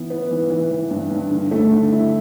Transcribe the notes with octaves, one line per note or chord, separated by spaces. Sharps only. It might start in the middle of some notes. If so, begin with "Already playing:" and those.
Already playing: E3 B3
B3
E3
E3
E3
G2
G2
D3
A3
D3
E4